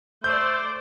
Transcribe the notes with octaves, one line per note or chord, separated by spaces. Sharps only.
A3 C5 D5 G6